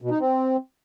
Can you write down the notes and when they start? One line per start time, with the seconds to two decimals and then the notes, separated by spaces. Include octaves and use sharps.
0.02 B2
0.11 D#4
0.20 C4